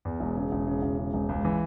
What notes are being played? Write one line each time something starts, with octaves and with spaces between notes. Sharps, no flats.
E2
E1
C#3
E1
C#3
E1
C#3
E1
C#2
E3